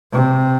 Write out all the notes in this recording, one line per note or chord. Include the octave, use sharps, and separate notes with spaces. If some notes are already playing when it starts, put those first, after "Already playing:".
C3